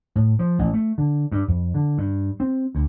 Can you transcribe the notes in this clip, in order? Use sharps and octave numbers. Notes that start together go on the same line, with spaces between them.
A2
F3
A1
A3
D3
G2
F2
D3
G2
C4
D2